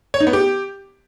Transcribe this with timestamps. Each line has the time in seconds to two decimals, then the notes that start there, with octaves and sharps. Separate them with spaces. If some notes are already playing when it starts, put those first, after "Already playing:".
0.14 C#5
0.20 D#4
0.27 B3
0.33 G4